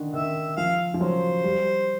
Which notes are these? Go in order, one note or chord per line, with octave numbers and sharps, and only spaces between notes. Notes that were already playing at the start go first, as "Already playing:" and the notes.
Already playing: D3 D#3
D#3 E5
F3 F5
F3
F#3 C5
G3